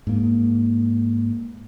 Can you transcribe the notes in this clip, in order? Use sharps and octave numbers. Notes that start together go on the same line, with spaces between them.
G#2 A#3